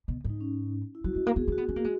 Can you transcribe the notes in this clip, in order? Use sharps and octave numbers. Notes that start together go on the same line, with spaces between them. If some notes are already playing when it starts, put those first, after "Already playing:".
B2
G#2
D#4
C#4
E4
F#3 F#4
G#3 F#4
A#3 F#4
B3 G#4
C#4 F#4
B3
C#4
A#3
G#3